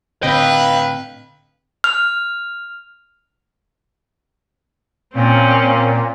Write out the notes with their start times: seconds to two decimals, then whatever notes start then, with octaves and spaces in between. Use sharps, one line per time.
0.23 A2 D3 C4 B4 D#5 F5 G5
1.84 F6
5.15 A#2 C4 C#4